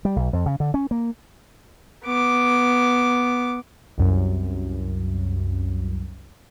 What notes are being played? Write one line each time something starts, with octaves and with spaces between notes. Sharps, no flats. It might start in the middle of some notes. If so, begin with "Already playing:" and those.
G3
B1
F2
C#3
D3
C#4
A#3
B3 D6
C2 F#2